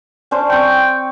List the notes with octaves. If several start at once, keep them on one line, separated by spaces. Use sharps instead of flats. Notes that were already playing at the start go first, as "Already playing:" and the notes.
C#4 D4 C5
C4 G5 C#6